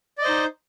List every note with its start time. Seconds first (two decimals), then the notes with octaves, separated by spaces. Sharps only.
0.18 D5
0.22 D#5
0.25 C5
0.28 D#4